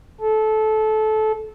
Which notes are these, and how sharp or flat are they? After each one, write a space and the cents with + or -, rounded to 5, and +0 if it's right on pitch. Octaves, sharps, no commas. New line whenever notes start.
A4 -20